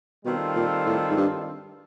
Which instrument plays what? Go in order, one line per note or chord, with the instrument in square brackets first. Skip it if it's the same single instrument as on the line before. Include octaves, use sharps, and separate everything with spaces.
[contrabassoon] B2 [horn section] D#3 G3 C4 F4 A4
[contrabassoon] A#2
A2
G#2
G2